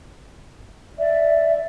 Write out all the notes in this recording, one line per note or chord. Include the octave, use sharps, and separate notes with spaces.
D5 E5